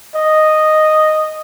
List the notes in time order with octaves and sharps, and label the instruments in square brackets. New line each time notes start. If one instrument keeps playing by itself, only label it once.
[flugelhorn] D#5